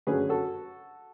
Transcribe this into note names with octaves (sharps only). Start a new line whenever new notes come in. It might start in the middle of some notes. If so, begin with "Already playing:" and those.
F#2 D3 F#3 A3 C#4 G#4 B4
F#4 A4